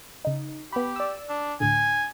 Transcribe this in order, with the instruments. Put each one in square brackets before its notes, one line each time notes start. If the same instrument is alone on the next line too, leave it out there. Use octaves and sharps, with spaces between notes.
[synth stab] C#3 D#4
[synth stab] B3 B5 [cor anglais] G4
[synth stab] D5 E6
[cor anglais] D4
[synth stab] D2 A2 D3 [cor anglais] G#5